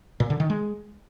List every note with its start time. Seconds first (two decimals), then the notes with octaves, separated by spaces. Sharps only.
0.20 A#2
0.30 D3
0.40 D#3
0.50 G#3